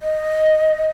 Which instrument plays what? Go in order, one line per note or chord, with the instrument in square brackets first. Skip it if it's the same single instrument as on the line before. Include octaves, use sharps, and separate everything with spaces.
[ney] D#5